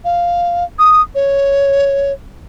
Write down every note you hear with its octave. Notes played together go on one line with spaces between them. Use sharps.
F5
D#6
C#5